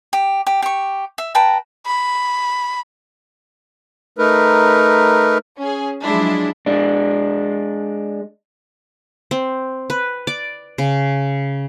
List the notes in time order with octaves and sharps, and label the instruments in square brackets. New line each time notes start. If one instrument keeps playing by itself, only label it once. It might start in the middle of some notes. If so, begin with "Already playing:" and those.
[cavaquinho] G4
G4
G4 C#6
E5
B4 G5 A5 A#5
[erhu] B5
[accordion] A3 D#4 A#4 B4
[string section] C#4 G#4
F3 F#3 G#3 D4 E4
[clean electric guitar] G#3 D4
[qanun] C4
B4
D5
C#3